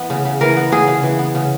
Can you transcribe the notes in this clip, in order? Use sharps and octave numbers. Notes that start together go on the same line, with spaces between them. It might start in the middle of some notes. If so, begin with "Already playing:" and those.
Already playing: E3 B3
C#3
C#3
E3 A#4
B3
C#3 G#4
C#3
E3
B3
C#3